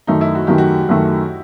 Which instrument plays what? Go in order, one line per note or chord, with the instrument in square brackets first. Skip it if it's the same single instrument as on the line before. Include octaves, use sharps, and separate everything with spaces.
[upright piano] F#2 D#3 A3 [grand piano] D#4
[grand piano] E4
F#4
[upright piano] F#2 D#3 A3 [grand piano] G4
[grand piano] F#4
[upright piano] F#2 D#3 A3